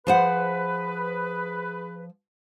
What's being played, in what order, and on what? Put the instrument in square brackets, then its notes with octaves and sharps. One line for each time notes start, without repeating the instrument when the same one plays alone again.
[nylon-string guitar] F3 C5 F#5 [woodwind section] G#4 B4